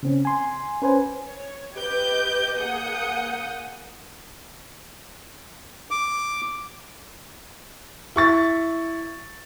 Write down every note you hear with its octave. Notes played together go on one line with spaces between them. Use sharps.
C#3 C4 C#4
G#5 C6
C#4 B4 C5 G#5
C#5
G4 B4 D#5 D6 G6
A#3 G#4 F#5 D#6 G6 C#7
D6
E4 C#6 A6